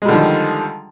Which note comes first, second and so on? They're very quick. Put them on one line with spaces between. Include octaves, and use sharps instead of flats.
G#3 G3 D3 F3 D#3